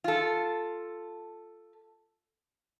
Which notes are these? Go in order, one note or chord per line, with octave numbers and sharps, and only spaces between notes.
F4 A4